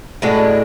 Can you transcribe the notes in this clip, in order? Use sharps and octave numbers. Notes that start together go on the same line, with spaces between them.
A2 G#3 A3 D4 F#4